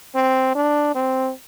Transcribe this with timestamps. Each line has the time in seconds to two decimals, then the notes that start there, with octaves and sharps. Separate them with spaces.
0.16 C4
0.55 D4
0.95 C4